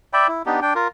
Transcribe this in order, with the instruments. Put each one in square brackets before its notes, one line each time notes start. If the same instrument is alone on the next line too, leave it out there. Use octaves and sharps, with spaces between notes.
[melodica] D5 E5 G5 B5
E4
B3 D4 D#4 G4
D4 G5
F4 A#4